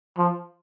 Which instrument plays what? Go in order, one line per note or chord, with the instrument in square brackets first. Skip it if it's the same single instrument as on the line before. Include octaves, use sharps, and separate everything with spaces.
[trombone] F3